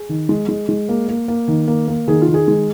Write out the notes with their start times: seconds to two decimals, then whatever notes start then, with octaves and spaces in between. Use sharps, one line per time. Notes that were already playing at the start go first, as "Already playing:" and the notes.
Already playing: G#4
0.09 D#3
0.29 G#3
0.48 G#3
0.69 G#3
0.89 A#3
1.09 A#3
1.28 A#3
1.48 D#3
1.68 A#3
1.88 A#3
2.08 D#3 G#4
2.22 F4
2.28 D#3
2.34 G#4
2.48 G#3